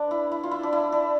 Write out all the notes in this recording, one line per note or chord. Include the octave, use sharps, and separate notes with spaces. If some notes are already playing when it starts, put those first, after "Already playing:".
Already playing: D4 B4
E4
E4
F4
E4
D4
E4
D4